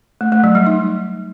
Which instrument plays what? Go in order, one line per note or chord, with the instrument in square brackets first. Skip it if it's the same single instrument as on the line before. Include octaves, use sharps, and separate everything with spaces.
[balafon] A3
A3
F#3
G3
D#4